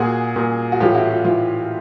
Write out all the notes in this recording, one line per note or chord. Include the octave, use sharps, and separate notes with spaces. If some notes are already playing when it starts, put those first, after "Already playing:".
Already playing: A#2 F#4 G#4
A#2
F#4
A2 E3 F4 G4
E4 F#4
F4
A2 E3 F4